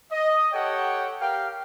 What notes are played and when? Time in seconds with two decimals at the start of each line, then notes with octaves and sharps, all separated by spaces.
0.12 D#5
0.53 G4 A4 C#5 F#5 G5
1.20 G4 A#4 F5 G5